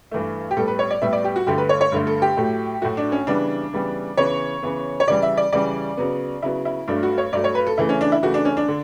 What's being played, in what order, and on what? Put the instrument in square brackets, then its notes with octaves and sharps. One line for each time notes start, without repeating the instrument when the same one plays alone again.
[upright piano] G2 E3 A3
G4
A2 G3 B3 A4
B4
C#5
D5
A2 G3 B3 E5
D5
G4
F#4
G2 D3 A3 G4
B4
C#5
C#5
G2 D3 A3
A4
G4
A2 F#3 A3
A2 F#3 A3 F#4
D4
C#4
C#3 E3 G3 B3 D4
C#3 E3 G3 B3
C#3 E3 B3 C#5
C#3 E3 B3
C#5
C#3 E3 G3 D5
E5
D5
C#3 E3 G3 D5
C#3 F#3 B3
C#3 F#3 B3 E4
E4
G2 F#3 A3 D4
F#4
C#5
G2 F#3 A3 D5
C#5
B4
A4
C#3 E3 A3 E4
C#4
D4
E4
C#3 E3 A3 F#4
D4
C#4
D4
D3